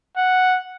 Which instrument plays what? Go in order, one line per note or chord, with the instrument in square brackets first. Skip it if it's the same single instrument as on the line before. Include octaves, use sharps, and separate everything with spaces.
[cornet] F#5